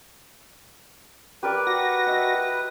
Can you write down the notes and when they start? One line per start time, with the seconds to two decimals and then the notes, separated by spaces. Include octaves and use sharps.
1.43 G4 A#4 B4 D5
1.67 F#4 A#6
2.07 D#5 E5